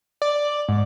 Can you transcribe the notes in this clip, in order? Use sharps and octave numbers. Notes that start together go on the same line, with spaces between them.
D5
G#2